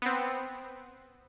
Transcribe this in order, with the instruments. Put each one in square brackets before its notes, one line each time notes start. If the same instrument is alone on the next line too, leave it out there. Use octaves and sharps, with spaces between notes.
[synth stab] B3 C4